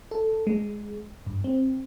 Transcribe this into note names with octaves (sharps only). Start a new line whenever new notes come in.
A4
G#3
G2
C4